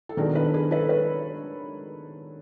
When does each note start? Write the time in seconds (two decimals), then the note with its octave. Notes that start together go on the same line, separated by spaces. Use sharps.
0.09 A4
0.17 D#3 F#3 B3 D4 G#4 A#4
0.35 A4 B4
0.54 G#4 A#4
0.71 A4 B4
0.89 B4 C#5